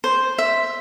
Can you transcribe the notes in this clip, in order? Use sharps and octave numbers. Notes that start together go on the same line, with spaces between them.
C5
E5